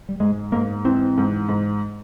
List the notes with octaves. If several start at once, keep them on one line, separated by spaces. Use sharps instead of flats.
G3
G#2 G#3
G#2 A#3
E3 C4
G#2
G#2